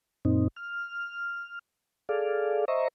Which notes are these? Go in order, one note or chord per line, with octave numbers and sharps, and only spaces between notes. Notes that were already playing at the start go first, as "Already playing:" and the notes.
F#2 A#2 C4 D#4
F6
G#4 A4 D5 F5
C5 D#5 E5 A#5 C#6